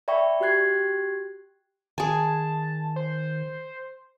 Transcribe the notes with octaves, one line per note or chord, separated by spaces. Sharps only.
D5 E5 G5 B5 C#6
F#4 G4 G5 F#6 G#6 C7
D#3 G#4 G#5 A5
C5